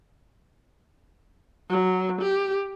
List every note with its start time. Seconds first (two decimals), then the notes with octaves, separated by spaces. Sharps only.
1.69 F#3
2.22 G4